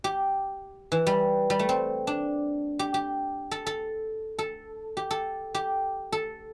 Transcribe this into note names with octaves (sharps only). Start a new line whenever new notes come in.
G4
E3
G3
G3
A3
C4
D4
G4
G4
A4
A4
A4
G4
A4
G4
A4